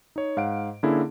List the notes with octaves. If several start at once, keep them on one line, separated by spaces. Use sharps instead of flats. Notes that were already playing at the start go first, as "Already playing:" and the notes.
D#4 C#5
G#2 F5 F#5 D7
D3 A#3 C#4 E4 G#4